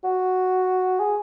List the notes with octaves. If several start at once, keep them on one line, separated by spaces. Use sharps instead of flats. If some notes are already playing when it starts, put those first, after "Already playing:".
F#4
G#4